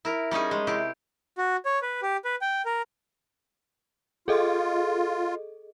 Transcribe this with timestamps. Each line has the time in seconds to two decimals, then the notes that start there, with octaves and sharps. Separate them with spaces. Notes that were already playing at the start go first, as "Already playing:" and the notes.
0.05 E4 A#4
0.31 G3 C#4 D#4 G#4
0.51 G#3
0.67 C3 E4 G4
1.38 F#4
1.65 C#5
1.82 B4
2.02 G4
2.25 B4
2.41 G5
2.65 A#4
4.28 F4 G#4 A4 D#5